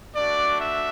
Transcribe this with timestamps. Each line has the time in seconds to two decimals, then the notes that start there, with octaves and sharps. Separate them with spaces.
0.16 A3 D4 F#4 D5
0.59 E5